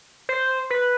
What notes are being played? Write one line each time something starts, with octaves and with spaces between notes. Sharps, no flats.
C5
B4